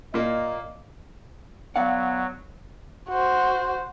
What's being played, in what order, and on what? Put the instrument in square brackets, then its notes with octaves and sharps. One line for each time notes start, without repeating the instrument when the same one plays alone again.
[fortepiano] A#2 A#3 [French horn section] D#5
[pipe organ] F#3 [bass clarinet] B3 [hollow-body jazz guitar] D5 F5 F#5
[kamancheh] F#4 C5